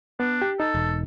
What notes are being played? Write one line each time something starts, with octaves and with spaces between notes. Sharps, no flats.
B3 D4
G4
D#4 A4
E1